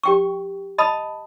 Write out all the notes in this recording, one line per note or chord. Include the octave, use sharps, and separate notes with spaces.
G4 G5 C#6
D#5 A5 B5 D#6